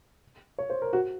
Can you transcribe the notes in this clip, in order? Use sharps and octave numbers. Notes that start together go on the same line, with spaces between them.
C#5
C5
A#4
F#4